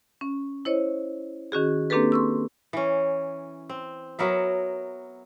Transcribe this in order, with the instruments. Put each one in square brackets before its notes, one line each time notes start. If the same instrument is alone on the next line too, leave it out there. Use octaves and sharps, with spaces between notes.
[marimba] C#4
E4 C5 C#5 D#5
D#3 C#4 F#4 G#4
A#3 C4 D4 G4 A4 B4
C6 C#6 E6
[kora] E3 C#4
C4
F#3 B3 A#4 E5